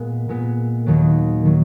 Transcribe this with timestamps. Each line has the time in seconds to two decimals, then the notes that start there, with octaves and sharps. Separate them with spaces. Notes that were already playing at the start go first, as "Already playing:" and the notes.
Already playing: A#2 G#3 B3
0.29 A#2 G#3 B3
0.86 D#2 D#3 F#3
1.45 D#3 F#3